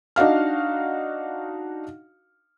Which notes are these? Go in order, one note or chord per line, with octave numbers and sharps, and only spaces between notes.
D4 D#4 F#4 F5 F6